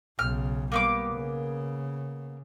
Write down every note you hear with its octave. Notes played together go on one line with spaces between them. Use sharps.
B1 C#3 F6
G3 A#3 B3 D6
C#3